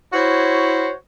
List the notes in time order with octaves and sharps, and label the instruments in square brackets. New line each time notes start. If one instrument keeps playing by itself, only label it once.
[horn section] E4 F#4 C5 C#5